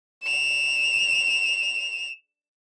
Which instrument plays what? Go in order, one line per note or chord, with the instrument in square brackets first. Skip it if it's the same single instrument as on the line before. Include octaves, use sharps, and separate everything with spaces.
[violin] E7 F7